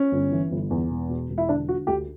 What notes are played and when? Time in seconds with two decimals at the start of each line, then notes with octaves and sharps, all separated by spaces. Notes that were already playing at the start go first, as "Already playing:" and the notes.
Already playing: C#4
0.12 G1
0.32 E3
0.52 G1
0.70 E2
0.90 E1
1.09 B2
1.30 E1
1.38 E4
1.49 D3 D4
1.68 D3 F#4
1.87 D2 G4